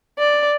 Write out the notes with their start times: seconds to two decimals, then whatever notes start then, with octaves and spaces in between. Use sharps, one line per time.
0.19 D5